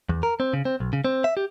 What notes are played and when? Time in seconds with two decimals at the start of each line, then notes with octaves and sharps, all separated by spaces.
0.09 E2
0.23 A#4
0.40 C4
0.53 C#3
0.65 C4
0.80 B1
0.93 C#3
1.05 C4
1.24 E5
1.37 G4